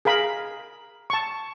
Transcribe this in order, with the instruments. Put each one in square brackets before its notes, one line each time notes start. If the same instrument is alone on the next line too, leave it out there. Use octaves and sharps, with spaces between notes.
[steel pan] G#4 A#4 F5 B5
A5 C#6